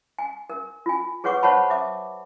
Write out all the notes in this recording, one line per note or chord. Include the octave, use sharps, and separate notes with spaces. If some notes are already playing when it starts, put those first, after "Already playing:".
G#5
A#4
F4 G#5
G#4 B4 C#5 F#5 C#6 D6
C5 C#5 F#5 A5 B5
E5 D6